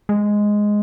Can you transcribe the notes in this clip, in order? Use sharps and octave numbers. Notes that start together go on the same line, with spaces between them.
G#3